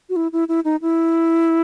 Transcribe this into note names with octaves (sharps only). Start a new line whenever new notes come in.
F#4
E4
E4
E4
D#4
E4